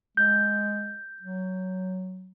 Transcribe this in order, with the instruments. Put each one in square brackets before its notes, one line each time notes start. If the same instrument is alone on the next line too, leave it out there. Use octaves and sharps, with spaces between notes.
[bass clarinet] G#3 [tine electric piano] G6
[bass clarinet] F#3